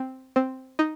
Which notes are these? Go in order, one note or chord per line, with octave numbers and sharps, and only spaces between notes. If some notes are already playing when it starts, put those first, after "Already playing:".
Already playing: C4
C4
D#4